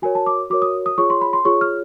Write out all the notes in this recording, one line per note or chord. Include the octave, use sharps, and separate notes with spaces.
F#4 A#4 C#5 G#5
A5
D6
F#4 A#4 C#5 D6
D#6
D#6
F4 G#4 C#5 C#6
C6
B5
C6
F4 G#4 C#5 C#6
F6